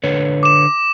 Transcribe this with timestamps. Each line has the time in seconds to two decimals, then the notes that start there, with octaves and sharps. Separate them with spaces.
0.04 D3 B4 C#5
0.43 D6 E7